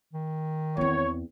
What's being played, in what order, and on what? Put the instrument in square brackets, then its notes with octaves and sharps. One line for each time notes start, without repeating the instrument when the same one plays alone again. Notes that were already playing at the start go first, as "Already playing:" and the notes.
[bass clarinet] D#3
[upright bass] E2 C4 [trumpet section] C#5